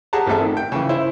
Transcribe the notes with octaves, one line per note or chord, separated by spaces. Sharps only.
G4 G#4 F#5 A5 A#5
A1 C4 A4 E5
D#3
G5
C#3 E3
E4 C5